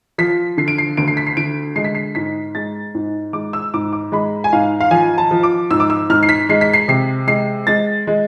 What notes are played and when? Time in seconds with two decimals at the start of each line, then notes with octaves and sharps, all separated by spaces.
0.18 F3 B6
0.57 D3 C7
0.68 D7
0.78 C7
0.97 D2 D7
1.08 C7
1.17 B6
1.27 C7
1.37 D3 D7
1.76 G#3 C7
1.84 B6
1.95 C7
2.15 G#2 B6
2.55 G#3 A6
2.95 G#2
3.33 G#3 D6
3.53 E6
3.74 G#2 D6
3.93 D6
4.12 G#3 B5
4.44 G#5
4.53 G#2 F5
4.81 F5
4.91 F3 G#5
5.18 A5
5.31 F3
5.43 D6
5.71 G#2 E6
5.80 D6
5.90 E6
6.10 G#2 F6
6.23 C7
6.29 B6
6.49 G#3 C7
6.61 B6
6.73 C7
6.88 C3 C7
7.27 G#3 C7
7.67 G#3 A6
8.07 G#3